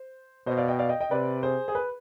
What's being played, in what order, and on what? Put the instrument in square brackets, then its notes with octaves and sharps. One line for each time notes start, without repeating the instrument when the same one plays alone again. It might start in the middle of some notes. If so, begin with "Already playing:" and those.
Already playing: [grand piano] C5
[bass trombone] B2 [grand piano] C5 D#5
[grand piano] D5 F5
D#5 G5
D5 F5
D#5 G5
D#5 G5
[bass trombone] C3 [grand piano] B4 D5
[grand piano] G#4 C5
G#4
B4